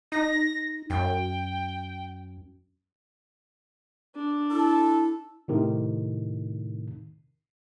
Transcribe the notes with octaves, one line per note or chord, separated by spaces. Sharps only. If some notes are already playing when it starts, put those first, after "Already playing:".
D#4 A#6
F#2 G5
D4
E4 A4
A2 C3 D#3